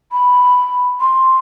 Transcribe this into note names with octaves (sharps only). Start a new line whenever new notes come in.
B5
C6